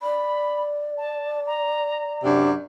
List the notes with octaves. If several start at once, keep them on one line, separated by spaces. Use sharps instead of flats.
D5 B5
A5
A#5
F#2 C3 D4